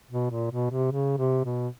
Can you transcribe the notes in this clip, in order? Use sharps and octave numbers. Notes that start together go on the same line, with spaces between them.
B2
A#2
B2
C3
C#3
C3
B2